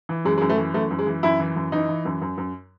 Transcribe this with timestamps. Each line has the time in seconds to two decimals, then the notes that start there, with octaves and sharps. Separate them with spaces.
0.09 E3
0.25 F#2 G#3
0.38 G#3
0.41 F#2
0.49 A3
0.58 E3
0.74 F#2 A3
0.91 F#2
0.99 G#3
1.07 E3
1.23 F#2 E4
1.40 E3
1.56 F#2
1.72 E3 D#4
1.89 E3
2.05 F#2
2.21 F#2
2.38 F#2